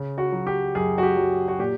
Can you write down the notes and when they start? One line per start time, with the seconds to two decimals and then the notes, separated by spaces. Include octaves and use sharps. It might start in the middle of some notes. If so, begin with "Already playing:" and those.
Already playing: C#3
0.18 F#4
0.32 F#3
0.47 G4
0.75 F#2 G#4
0.98 F#4
1.03 G4
1.17 F#3
1.48 F#4
1.59 A#2 G4